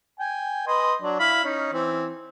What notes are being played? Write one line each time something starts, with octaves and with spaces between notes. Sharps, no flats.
G5 G#5
B4 D#5 C6
F#3 D4 D5
E4 F5 B5
C#4 D#4
E3 C4